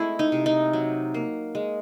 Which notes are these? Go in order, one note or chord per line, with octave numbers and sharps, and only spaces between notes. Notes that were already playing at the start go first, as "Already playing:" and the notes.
Already playing: G#3 A3 C4 E4
D#4
C3
D#4
F#3
A#3
G#3